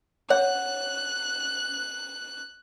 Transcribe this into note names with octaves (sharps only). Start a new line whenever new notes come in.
C#5 F#5 F#6